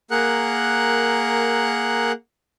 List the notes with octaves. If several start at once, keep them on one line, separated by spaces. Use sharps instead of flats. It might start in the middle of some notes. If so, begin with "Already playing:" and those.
A#3 G#4 A#4 F#5 F#6